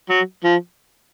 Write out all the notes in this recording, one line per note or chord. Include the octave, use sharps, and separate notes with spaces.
F#3
F3